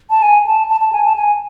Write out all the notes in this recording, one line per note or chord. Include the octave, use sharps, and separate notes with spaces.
A5
G#5
A5
A5
A5
G#5
A5
G#5